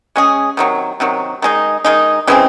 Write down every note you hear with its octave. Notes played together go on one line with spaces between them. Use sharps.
G#3 C#4 G#4
C3 D#3 F#3
C3 D#3 F#3
D#3 G#3 D#4
D#3 G#3 D#4
C#3 E3 G#3 C4